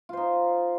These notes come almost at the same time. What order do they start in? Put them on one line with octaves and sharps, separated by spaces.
F4 C5 D#4